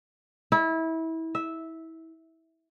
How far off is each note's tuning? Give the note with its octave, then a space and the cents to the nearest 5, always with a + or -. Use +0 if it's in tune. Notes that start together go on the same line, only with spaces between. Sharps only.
E4 -25
E5 -10